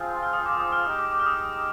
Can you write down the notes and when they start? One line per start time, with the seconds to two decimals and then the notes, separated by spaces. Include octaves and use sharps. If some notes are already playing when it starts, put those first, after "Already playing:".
Already playing: F3 C4 F4 G#4
0.23 F6
0.33 D#6
0.46 D6
0.60 D#6
0.72 F6
0.85 G#3 D#4 G4 D#6
0.99 D6
1.12 D6
1.20 F6
1.26 D#6